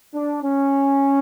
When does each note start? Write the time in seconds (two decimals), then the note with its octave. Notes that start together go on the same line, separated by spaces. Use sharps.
0.14 D4
0.43 C#4